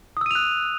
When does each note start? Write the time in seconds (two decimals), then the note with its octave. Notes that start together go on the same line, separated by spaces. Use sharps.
0.17 D#6
0.21 E6
0.26 D#7
0.31 F7
0.35 F#6